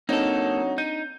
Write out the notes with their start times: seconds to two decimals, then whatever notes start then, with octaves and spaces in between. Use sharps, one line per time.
0.09 F#3 A#3 C4 D4 D#4 A4
0.78 D#4 G6 D#7